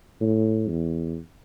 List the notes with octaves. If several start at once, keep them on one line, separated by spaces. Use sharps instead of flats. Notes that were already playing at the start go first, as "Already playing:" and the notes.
A2
E2